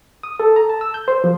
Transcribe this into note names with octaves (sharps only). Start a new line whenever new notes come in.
D#6
A4
A#5
A5
E6
G6
C5
F3